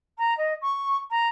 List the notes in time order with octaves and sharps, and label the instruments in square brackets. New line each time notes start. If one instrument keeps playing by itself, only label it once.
[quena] A#5
D#5
C#6
A#5